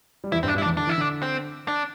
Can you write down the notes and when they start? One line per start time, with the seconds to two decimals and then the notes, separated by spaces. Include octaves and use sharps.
0.24 G3
0.32 E2 E3 E4
0.43 G2 G3 C4
0.48 D4
0.55 G2 G3
0.58 E4
0.63 D4
0.66 E2 E3
0.77 D3 D4
0.87 E3 E4
0.98 D3 D4
1.22 C4
1.68 D4